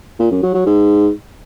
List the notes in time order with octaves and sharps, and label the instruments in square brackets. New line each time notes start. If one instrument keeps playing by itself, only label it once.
[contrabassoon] A#2
F#2
F#3
F#3
G#2